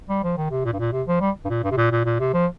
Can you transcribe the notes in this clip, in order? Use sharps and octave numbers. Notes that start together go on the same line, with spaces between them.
G3
F3
D#3
C3
A#2
G2
A#2
C3
F3
G3
G2
A#2
G2
C3
A#2
A#2
A#2
C3
F3